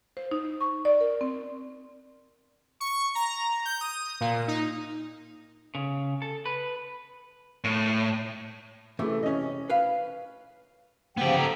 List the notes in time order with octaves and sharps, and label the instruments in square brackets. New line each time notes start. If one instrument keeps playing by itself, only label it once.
[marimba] C5
D#4
C#6
D5
A#4
C4
[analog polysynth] C#6
A#5
G6
D#6
A#2
D#4
[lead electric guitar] C#3
A4
B4
A2
[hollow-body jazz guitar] C3 E3 [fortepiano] G#3 A3
[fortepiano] C#4 D#5
[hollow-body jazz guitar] B4 F5
[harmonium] C#3 F3 G5 [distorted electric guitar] B3 G4
[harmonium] A4 A#5